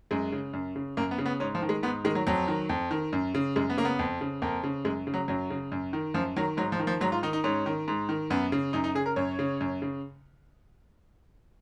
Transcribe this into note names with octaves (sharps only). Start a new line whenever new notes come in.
F#2 G#3
C#3
F#2
C#3
F#2 A#3
B3
C#3
B3
G#2 C#4
F3
D#3
G#3
G#2 B3
D#3 G#3
F#3
F2 F#3
D#3
F2
D#3
F#2
C#3
F#2 G#3
B3
C#3 A#3
B3
F2
C#3
F2 A#3
C#3
F#2 G#3
C#3
F#3
F#2 F#3
C#3
F#2
D#3
F#2 F3
D#3 F#3
G#2 F#3
F3
D#3
F3
G#2 F#3
F4
D#3 D#4
D#4
G#2 C#4
D#3
G#2
D#3
F#2 B3
C#3
F#2 D#4
D#4
C#3 G#4
A#4
F#2 C#5
C#3
F#2
C#3